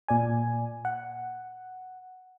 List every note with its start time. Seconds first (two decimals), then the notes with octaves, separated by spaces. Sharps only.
0.08 A#2 D5 G#5
0.85 F#5